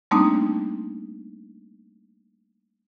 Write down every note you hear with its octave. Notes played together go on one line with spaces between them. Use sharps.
G3 A3 A#3 C4 D4 D#4